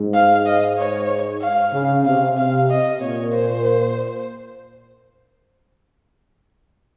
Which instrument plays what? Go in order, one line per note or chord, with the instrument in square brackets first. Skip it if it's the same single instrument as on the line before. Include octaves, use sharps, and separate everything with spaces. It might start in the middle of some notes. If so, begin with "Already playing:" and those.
Already playing: [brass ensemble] G#2
[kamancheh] F5
D#5
C#5
F5
[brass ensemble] C#3
[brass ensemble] C3 [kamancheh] F5
[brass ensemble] C3 [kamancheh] F5
[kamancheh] D#5
[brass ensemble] A#2 [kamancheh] C#5
[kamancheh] C5